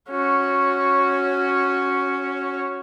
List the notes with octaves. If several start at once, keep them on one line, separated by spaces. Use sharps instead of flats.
C#4 F#4